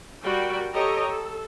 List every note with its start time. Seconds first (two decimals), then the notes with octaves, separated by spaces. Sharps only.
0.23 G3 F#4 A#4 D5 G5
0.74 G4 A4 C#5 D#5 A#5
1.10 A4